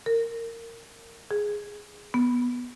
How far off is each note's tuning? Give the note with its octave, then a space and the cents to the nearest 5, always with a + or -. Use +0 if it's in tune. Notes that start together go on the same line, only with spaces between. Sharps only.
A#4 -20
G#4 +0
B3 -10